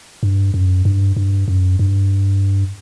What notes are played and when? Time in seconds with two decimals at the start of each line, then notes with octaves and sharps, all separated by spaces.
0.23 G2
0.54 F#2
0.85 G2
1.17 G2
1.48 F#2
1.79 G2